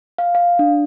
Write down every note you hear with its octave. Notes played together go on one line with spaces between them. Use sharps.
F5
F5
D4